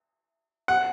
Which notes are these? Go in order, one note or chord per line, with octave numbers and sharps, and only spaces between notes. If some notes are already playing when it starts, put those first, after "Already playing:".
F#5